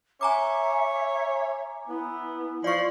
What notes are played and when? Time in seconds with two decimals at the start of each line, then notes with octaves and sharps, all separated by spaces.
0.21 C#5 E5 G#5 A#5 D6
1.89 B3 E4
2.64 F3 D5 C#6